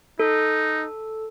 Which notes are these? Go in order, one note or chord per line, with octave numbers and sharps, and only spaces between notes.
D#4 A4